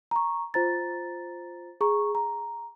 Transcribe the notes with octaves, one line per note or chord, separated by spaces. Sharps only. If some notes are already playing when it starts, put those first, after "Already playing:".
A#5 C#6
F4 C5 A#5 A6
G#4 A#5 C#6
A#5